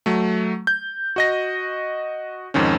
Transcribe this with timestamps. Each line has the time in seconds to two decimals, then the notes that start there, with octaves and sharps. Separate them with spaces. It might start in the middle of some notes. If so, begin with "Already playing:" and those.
0.06 F#3 A3
0.67 G6
1.16 F#4 D#5 A#6
2.54 F2 G#2 D#3 C#4